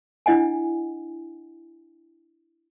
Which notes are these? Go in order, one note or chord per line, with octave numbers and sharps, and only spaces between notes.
D4 E4 D#5 F#5 G#5